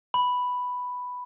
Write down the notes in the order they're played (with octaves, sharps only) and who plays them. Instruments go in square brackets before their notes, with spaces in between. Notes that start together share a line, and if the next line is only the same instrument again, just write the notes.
[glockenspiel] B5